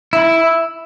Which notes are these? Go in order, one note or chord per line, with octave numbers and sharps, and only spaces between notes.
E4